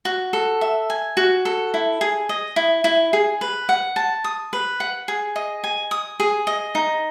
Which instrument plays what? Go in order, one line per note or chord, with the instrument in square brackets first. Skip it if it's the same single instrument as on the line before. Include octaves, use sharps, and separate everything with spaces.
[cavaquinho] F#4
A4
E5
G#5
F#4
A4
E4
G#4
D#5
E4
E4
G#4
B4
F#5
A5
D#6
B4
F#5
G#4
D#5
G#5
D#6
G#4
D#5
D#4